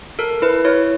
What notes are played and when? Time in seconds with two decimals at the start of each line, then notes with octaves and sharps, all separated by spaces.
0.19 A4 A#4
0.42 E4 B4
0.65 E4 C#5